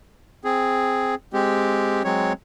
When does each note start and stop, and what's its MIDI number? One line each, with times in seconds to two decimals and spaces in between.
0.44 1.15 60
0.44 1.15 68
1.33 2.03 56
1.33 2.03 60
1.33 2.03 67
2.05 2.33 54
2.05 2.33 56
2.05 2.33 60
2.05 2.33 73